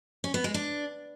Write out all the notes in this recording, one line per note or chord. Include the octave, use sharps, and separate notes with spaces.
C#4
B3
G#3
D4